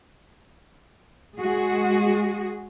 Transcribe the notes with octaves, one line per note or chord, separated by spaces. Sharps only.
G#3 F#4 G#4